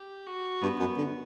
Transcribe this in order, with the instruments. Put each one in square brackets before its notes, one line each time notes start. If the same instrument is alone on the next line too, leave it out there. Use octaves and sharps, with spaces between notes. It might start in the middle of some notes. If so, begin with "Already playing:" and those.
Already playing: [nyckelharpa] G4
F#4
[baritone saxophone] G2 [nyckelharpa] B3
[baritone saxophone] F#2
D3